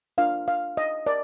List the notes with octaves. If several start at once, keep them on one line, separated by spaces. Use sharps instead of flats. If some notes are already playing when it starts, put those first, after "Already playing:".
D4 F4 A#4 F5
F5
D#5
A#4 D5